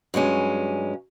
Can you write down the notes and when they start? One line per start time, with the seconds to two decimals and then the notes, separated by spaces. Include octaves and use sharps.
0.14 G2 F#3 G#3 C#4